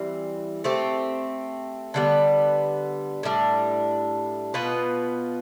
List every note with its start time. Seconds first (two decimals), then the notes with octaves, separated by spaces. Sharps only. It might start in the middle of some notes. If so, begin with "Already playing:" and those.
Already playing: E3 G3 C4
0.64 A3 C4 G4
1.94 D3 G3 B3
3.23 A2 G3 D4
4.54 B2 B3 F4 B4